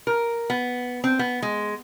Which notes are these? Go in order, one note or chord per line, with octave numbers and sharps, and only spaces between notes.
A#4
B3
C4
B3
G#3